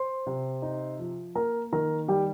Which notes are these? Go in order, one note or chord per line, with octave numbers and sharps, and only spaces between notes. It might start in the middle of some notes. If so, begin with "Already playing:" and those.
Already playing: C5 C6
C3
D#4
F3
A#3 A#4 A#5
D#3 A#4 A#5
G3 G4 G5